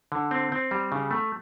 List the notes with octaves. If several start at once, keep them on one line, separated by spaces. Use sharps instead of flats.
D3
C4
C4
G3
C#3
A3